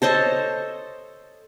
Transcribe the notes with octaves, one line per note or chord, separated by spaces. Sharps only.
A4 C5 C#5 D#5